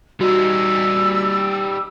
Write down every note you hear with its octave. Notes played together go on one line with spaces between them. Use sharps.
G3 D#4 F#4 E6